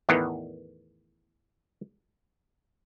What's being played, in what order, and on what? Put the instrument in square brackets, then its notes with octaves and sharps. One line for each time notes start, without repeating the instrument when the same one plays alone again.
[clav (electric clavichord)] E2 A2 D#3 E3 B3